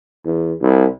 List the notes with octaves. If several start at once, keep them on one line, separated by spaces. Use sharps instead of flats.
E2
C2